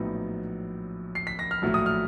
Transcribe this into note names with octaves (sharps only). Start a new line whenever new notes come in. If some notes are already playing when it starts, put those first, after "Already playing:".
Already playing: A#1 A2 F#3 B3 D#4
C7
B6
A#6
F6
A#1 A2 F#3 A3
D#6
F6